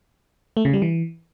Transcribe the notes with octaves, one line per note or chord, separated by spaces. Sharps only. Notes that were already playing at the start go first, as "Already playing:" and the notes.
A3
C#3
G3
E3